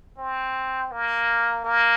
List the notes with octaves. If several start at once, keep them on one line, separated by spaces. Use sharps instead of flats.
C4
A#3
A#3